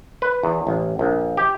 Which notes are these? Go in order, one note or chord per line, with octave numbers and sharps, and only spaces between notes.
B4
E2
A1
A#1
G4